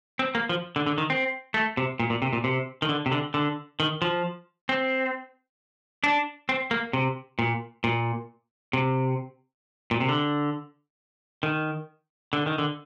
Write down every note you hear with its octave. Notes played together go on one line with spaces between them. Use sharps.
C4
A#3
F3
D3
D3
D#3
C4
A3
C3
A#2
A#2
C3
A#2
C3
D#3
D3
C3
D3
D3
D#3
F3
C4
D4
C4
A#3
C3
A#2
A#2
C3
A#2
C3
D3
D#3
D3
D#3
D3